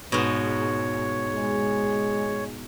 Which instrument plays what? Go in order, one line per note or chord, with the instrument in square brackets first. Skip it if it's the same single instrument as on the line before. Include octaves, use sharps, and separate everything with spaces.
[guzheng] G#2 B2 [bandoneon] C#5
[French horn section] G#3